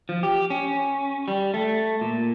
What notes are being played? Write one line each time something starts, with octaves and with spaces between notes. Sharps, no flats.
F3
G4
C#4
G3
A3
A#2